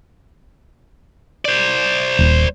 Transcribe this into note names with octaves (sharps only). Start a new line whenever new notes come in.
C5 D5
D#1